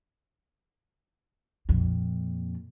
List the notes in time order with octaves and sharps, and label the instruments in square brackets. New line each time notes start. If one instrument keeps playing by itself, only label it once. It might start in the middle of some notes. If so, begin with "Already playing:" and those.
[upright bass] F2 A#2